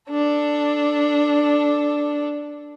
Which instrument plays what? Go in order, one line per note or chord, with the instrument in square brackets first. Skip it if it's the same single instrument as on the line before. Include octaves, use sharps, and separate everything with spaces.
[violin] D4 A4